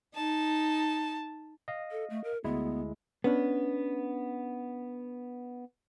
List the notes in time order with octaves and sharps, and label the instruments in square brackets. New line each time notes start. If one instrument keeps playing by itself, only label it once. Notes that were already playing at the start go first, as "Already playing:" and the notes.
[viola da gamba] D#4 [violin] A5
[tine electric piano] D#5 F5
[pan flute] A4
A3
A#4
[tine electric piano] D2 G#3 E4 [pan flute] B3
[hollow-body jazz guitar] B3 C#4 D4